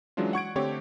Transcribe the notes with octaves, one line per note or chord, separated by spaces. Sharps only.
E3 F#3 G#3 C#4 D4 F4
F#5 C#6 G#6 D7
D3 A3 C4 G4 C#5